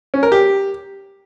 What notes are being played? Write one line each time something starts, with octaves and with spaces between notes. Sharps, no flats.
C#4
A#4
G4